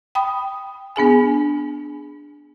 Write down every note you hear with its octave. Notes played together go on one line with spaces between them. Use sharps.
G5 B5 D#6
B3 D4 G#4 G#5